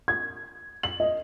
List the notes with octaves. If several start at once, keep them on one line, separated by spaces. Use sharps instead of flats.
G#6
F#7
D#5